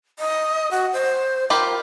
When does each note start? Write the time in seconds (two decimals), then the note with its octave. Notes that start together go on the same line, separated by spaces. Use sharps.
0.19 D#5
0.71 F#4
0.93 C5
1.50 F4 G4 A#4 B5